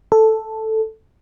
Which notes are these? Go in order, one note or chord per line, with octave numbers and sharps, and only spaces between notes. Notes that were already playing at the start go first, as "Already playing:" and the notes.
A4